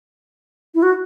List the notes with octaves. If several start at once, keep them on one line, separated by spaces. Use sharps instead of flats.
E4
F#4